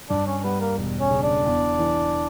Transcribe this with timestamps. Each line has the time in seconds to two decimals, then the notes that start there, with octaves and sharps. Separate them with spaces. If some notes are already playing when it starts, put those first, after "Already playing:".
0.09 G2 D4 D5
0.27 C#4 C#5
0.44 G3 B3 B4
0.61 A#3 A#4
0.78 E1
1.00 C#4 C#5
1.11 C#3
1.23 D4 D5
1.45 E2
1.79 E3